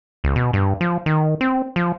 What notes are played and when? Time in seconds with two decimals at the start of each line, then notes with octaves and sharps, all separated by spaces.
0.24 C#2
0.36 B2
0.53 G2
0.81 F3
1.06 D#3
1.41 C4
1.76 F3